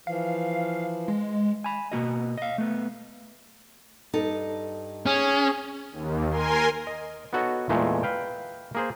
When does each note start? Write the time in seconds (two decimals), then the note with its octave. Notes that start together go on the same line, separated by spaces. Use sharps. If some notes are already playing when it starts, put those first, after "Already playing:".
0.07 E3 F3 F5
1.08 G#3
1.64 G#5 B5
1.92 B2 A#3 F#4 D#5
2.38 D#5 F5
2.58 A3 B3
4.13 G2 D#4 A4
5.06 C#4 G#4
5.92 D#2
6.31 A#4 G#5 C6
6.87 D#5
7.33 B3 D#4 F#4 A4 C#5 D#5
7.69 E2 A#2 G#3 A3
8.03 B4 F5 G5
8.75 A#3 G#4 C5